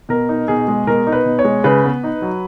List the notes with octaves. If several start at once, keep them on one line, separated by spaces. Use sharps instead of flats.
B2 A#4
D#4
B2 G#4
G#3
B2 A#4
D#4
B4
B2
C#5
G#3
C#3 B4
B3
D#4
F#3